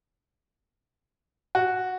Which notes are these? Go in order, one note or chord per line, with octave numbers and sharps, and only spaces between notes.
F#4